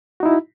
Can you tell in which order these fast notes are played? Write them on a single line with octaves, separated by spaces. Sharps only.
F#4 D#4 E4